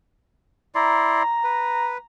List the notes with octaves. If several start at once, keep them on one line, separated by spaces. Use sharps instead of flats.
E4 D5 A#5 C6
B4